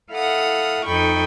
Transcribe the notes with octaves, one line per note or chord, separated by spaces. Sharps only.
E4 A4 F5 F#5 D#6
F2 D#4 A4 G5 B5 C#6